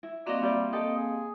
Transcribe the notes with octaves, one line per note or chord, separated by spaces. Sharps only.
E4
A#3 C4 F#4 D5 D#5 F5
G3 E4 G4 D5
G4 A4 D#5
G#4